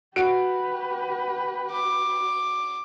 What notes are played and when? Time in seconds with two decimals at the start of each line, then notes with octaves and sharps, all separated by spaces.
0.16 F#4 G4 B4 D7
1.72 D6